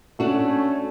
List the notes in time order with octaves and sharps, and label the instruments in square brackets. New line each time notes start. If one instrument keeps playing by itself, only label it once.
[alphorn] A3 [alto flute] C#4 [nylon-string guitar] D4 F#4